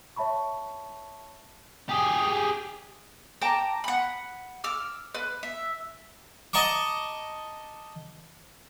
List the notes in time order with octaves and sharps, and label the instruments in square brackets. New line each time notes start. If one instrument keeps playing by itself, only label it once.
[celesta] C#5 E5 A5 B5 C#6
[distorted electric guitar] G4 G#4
[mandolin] G5 A5 A#5 D6
F#5 B5
D6 E6 F6
B4
E5
[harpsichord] D#5 A5 A#5 C#6 D6